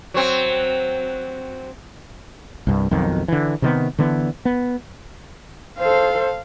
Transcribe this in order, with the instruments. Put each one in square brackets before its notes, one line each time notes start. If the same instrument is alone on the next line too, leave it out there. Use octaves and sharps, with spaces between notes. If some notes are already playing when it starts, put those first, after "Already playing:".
[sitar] F#3 C4
[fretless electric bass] C2 G2
B1 F2 D#3
D3 E3
C3 D#3 B3
D3 E3 B3
B3
[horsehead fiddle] A4 C5 [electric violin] F5